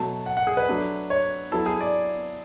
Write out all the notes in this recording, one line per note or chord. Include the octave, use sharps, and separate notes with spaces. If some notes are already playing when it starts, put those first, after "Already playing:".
Already playing: B2 F#3 A3 A5
F#5
F#5
G#4
B4
F#3 A3 D4
C#5
F#3 B3 E4 A4
G#4
D5